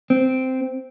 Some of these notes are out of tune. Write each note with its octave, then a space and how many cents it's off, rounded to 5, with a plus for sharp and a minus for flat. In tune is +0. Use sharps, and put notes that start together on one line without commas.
C4 -10